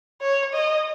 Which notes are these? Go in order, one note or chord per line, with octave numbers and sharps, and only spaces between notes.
C#5
D#5